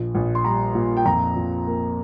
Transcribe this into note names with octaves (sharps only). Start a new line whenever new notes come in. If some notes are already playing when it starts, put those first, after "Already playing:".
Already playing: A#1 F3
A#1
C6
G3 A#5
A#2
G5
F2 A#5
F2
A#3